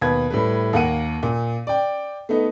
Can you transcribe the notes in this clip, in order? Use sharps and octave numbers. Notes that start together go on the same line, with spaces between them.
D#2 B2 B4 G#6
A2 G3 B4
D#2 A#3 A#4 F#5 D#7
A#2
D5 G5
A3 B3 D#4